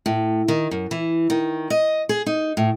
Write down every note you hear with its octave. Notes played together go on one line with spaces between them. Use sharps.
A2
D#3
F#2
E3
D#3
D#5
G#4
D#4
A2